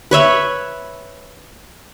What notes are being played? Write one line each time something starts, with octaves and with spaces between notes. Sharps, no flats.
B4 C#5 E5 B5